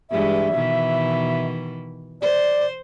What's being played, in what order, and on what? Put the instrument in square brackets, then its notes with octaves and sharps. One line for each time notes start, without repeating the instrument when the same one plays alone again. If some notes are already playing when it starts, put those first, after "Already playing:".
[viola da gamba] G2 E3 G#3 [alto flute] E5
[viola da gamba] B2 D#3 E3
[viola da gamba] C5 [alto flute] D5